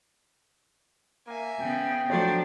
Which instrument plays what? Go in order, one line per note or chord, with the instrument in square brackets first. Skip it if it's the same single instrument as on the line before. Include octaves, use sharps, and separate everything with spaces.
[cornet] A#3 [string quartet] E5 G#5
[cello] C#3 B3 [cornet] G5
[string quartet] F3 [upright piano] F#3 A3 C#5 [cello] D4